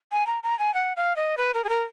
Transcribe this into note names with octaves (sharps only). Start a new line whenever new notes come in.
G#5
A#5
A#5
G#5
F#5
F5
D#5
B4
A#4
G#4
A#4